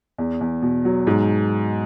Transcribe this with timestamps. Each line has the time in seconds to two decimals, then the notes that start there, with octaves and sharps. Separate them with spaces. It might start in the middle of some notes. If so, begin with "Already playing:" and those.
0.18 E2
0.41 E2
0.62 B2
0.85 F#3
1.07 G#2